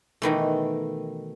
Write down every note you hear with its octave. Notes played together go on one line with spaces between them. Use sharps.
B2 D#3 E3 A3